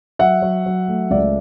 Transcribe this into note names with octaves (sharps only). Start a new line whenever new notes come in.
F#3 E5 F#5
F#3
F#3
A3
C#2 D5 E5